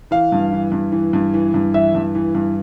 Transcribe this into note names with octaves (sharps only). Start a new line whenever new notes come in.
E3 F5
G2
E3
G2
E3
G2
E3
G2
E3 E5
G2
E3
G2